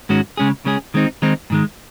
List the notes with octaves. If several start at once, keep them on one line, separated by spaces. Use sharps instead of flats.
G#2 D#3 G#3 C#4 F#4
C#3 G#3 C#4 G#4
C#3 G#3 C#4 G#4
D#3 G#3 C4 D#4
D#3 G#3 C4 D#4
G#2 D#3 G#3